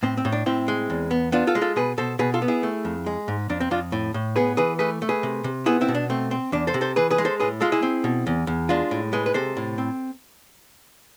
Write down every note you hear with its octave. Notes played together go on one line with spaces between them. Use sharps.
A2 C4
C4
A2
D4
A2 C4 E4
G#3
E2
B3
B3 D4 F4
F4 A4
G#3
F4 A4
B2 G#4 B4
B2 A4 C5
B2 G#4 B4
F4 A4
B3
E4 G#4
A3
F2
G#3
G#2
F2 D4
C4
F2 D4 F4
A2
A2
B3 G#4 B4
E3 G#4 B4
A3 G#4 B4
A3
G#4 B4
C3
C3
B3 E4 G#4
C4 E4
B2
D4
A3 C4
C4
E2 D4
A4 C5
C3
A4 C5
E3 G#4 B4
G#4 B4
G#3
A4 C5
A2 G#4 B4
G#3 F4 A4
E4 G#4
C4
B2
E2
E2
G#3 D4 F4
A2
G#3 G#4 B4
B4
C3 A4 C5
A2
C4